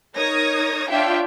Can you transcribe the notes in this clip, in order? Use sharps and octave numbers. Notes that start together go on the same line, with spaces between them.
D#4 A#4 C#5 D#6 G#6 A#6
D4 F4 C#5 E5 F5 G5